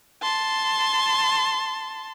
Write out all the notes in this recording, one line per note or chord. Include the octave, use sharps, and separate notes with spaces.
A5 C6